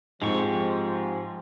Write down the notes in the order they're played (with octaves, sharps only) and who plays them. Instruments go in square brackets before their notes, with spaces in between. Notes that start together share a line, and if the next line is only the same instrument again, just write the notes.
[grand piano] G#2 C4 [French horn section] F3 [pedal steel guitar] G#3 G4 C#6